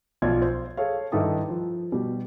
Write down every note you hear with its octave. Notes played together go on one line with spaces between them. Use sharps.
B1 F3 F4 D5 G#6
C5
G#4 A4 C#5 F5
G2 D#3 E4 A4 D#6
F3
B2 G3